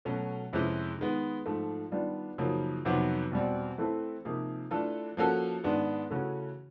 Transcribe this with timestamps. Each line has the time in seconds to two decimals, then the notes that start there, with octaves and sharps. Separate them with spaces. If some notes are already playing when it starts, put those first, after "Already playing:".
0.05 B2 F#3 A3 C#4
0.53 F2 C3 E3 G#3 C#4
0.98 D#3 G#3 B3
1.46 G#2 F3 A3
1.92 D#3 G3 B3 D4 F4
2.38 F#2 C#3 F3 A#3 D#4
2.85 F2 C3 D#3 F#3 B3
3.32 E2 B2 G3 C4
3.78 E3 A3 C4 E4 A4
4.25 C3 F3 A#3 D#4 G#4
4.71 E3 A3 D4 F4 A4
5.17 F3 A#3 C#4 F#4 A4
5.64 G#2 D#3 G#3 B3 D4
6.11 C#3 E3 A3 C#4 F#4